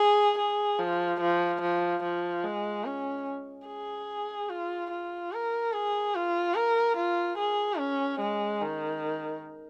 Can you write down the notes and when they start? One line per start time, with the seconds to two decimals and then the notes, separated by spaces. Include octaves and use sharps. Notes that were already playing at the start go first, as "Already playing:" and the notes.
Already playing: G#4
0.38 G#4
0.79 F3
1.21 F3
1.61 F3
2.03 F3
2.44 G#3
2.85 C#4
3.67 G#4
4.49 F4
4.91 F4
5.32 A#4
5.73 G#4
6.15 F4
6.55 A#4
6.97 F4
7.38 G#4
7.78 C#4
8.20 G#3
8.61 D#3